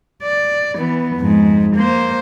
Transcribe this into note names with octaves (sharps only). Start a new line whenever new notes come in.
D5
E3 B3
F2 G#2
A#3 C5